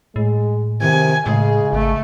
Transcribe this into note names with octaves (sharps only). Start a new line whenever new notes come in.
A2 G#3
C3 D#3 G#5
A2 C#3 G#3 G#4
G#1 A3